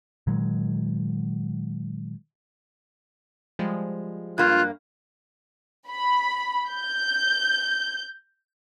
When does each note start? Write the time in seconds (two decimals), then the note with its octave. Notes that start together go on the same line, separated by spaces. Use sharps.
0.27 A#2 D#3 F#3 G#3
3.59 F3 G3 G#3
4.38 G2 A#3 F4 F#6
5.90 B5
6.71 G6